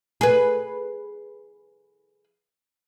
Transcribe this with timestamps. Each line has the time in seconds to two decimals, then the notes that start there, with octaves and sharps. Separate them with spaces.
0.21 G#4 B4